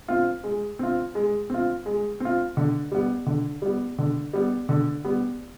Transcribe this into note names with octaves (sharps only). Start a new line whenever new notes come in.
C4 F4
G#3
C4 F4
G#3
C4 F4
G#3
C4 F4
D3
G3 B3
D3
G3 B3
D3
G3 B3
D3
G3 B3